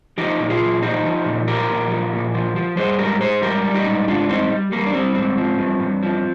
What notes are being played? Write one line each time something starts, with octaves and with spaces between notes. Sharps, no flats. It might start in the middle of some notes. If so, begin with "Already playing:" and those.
F3 D#4 G4
A#2
F4 G#4
A#2
F3 D#4 G4
F3
A#2
F3 G4 A#4
A#2
F3
A#2
F3
F3
G3 G#4 C5
G#2 G4 A#4
G#2 G#4 C5
G3 G4 A#4
G3
D#4 G4
G#2
G#2 D4 F4
G3 C4 D#4
G3
G3 A#3
D4
G3 C4
G#2 C4
F3
G2
G2
F3